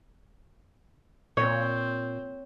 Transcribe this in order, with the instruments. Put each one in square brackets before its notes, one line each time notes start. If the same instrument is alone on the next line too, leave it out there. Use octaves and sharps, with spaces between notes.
[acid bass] A#2 [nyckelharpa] C4 [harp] C#5